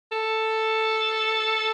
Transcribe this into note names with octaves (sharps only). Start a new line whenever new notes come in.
A4